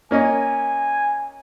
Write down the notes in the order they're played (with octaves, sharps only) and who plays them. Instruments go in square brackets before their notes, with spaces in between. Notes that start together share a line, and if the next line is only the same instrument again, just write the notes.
[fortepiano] A#3 C#4 D#5 [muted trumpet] G#5